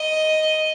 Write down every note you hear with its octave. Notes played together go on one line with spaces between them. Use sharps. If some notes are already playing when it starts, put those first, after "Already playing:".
Already playing: D#5